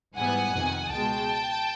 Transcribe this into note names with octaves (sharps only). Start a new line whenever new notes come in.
G#2 E3 G3 B3 F#5 G#5
F2 C3 D#3
C#2 B2 G#3 G5 A5